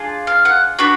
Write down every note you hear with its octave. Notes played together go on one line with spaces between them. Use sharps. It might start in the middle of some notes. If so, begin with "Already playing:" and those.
Already playing: D4 F4 G#4
F5
F#5
D4 F#4 B5